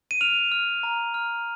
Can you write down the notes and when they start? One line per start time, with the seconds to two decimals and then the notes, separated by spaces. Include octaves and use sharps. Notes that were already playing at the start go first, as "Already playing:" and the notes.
0.11 D#7
0.21 F6 F7
0.52 F6
0.83 A#5
1.14 F6